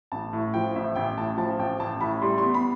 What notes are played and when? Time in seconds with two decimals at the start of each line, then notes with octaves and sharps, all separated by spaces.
0.12 A1 A5
0.33 A2
0.54 F3 G5
0.75 A1 E5
0.95 A1 G5
1.17 A2 A5
1.38 F3 A5
1.59 A1 G5
1.80 A1 A5
2.01 A2 B5
2.22 G3 C6
2.38 B3 C6
2.54 B5